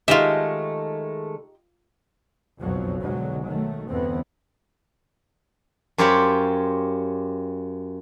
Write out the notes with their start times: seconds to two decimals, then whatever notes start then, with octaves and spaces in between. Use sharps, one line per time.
0.08 D#3 G#3 A3 D#4 F4 G4 D#5 E5
2.60 F#1 B1 F2 F3 F#3
3.02 B1 G#2 D3 F#3 G#3
3.46 D#3 F#3 A3
3.91 E2 G2 D3 E3 B3 C4
5.98 F#2 F4 G4 C5 C#5 B5